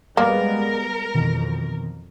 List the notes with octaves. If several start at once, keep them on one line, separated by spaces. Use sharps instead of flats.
G3 G#3 A#3 B3 A#4
F2 B2 D#3 E3